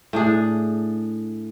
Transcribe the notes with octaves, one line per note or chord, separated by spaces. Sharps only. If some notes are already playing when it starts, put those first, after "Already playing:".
A2 D4 G#4